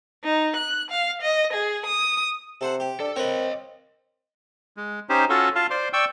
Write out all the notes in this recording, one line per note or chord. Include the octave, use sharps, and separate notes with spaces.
D#4
F#6
F5
D#5
G#4
D#6
C3 A4 C5 F#5
G4
D4 A4
C4 A#4 B4 C#5 D#5
G#3
C#4 D#4 G4 C5
C#4 F4 F#4 A4
F4 F5 A5
C5 D5 C6
D5 G5 C#6 E6